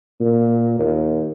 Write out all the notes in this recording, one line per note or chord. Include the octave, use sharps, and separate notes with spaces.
A#2
D#2